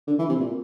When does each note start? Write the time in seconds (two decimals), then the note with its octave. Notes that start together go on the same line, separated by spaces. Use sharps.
0.07 D3
0.19 E3
0.29 C3
0.40 A#2